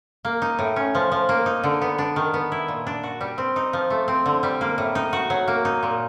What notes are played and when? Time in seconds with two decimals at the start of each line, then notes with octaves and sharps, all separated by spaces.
0.25 A#3
0.42 D#4
0.59 A2
0.76 C#4
0.95 F3
1.12 F3
1.29 A#3
1.46 D#4
1.64 D3
1.82 B3
1.98 D4
2.16 D#3
2.34 B3
2.52 E4
2.68 A#2
2.87 D4
3.03 F#4
3.21 G3
3.38 C4
3.56 D#4
3.73 F3
3.90 A3
4.08 C4
4.26 D3
4.43 G3
4.61 A#3
4.78 A2
4.95 D#4
5.13 F#4
5.30 F#3
5.48 A#3
5.65 D#4
5.83 A#2